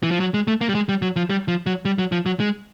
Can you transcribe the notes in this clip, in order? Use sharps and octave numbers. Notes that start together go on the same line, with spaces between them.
E3
F3
F#3
G#3
A3
A#3
G3
G#3
G3
F#3
F3
G3
F3
F#3
G3
F#3
F3
F#3
G#3